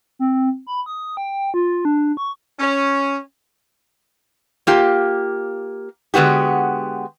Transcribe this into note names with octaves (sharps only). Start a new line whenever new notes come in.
C4
B5
D#6
G5
F4
D4
C#6
C#4
A#3 F4 G4
D3 G#3 B3 F#4 G4